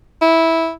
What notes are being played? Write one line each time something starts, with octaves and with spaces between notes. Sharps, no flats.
E4